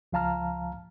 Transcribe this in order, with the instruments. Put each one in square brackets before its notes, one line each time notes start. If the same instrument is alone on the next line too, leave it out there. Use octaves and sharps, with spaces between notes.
[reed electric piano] C#2 F3 F5 A5 A#5 F6